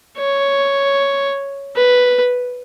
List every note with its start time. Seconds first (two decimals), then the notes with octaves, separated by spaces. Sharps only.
0.18 C#5
1.76 B4